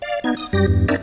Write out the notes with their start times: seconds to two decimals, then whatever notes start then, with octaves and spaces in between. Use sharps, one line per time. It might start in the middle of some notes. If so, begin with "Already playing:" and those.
0.02 D5 F5
0.24 B3 D#4 G#6
0.37 D#6
0.53 F#2 G3 G4 A#6
0.68 E2 G2
0.88 C4 D4 D#4 A#4 D5 E5